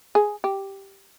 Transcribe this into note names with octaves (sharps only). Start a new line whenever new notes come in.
G#4
G4